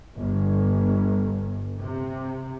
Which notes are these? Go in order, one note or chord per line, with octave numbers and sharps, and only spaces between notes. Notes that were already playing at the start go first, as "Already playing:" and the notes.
G1
C3